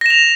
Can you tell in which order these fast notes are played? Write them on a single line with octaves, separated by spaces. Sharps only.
A#6 E7 F7